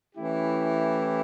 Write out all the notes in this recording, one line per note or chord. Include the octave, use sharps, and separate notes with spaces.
E3 A3 C#4 E4 G4